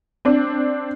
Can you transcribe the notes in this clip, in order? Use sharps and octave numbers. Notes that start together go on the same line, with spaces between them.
C4 D4